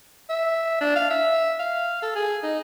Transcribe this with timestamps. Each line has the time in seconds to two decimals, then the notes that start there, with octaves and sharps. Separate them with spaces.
0.29 E5
0.81 D4
0.96 F5
1.10 E5
1.59 F5
2.02 A4
2.15 G#4
2.43 D#4